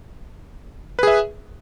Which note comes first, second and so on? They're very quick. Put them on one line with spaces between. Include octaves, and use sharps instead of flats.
B4 G#4 E5